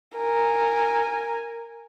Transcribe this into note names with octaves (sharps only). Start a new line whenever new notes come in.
A#4 G#5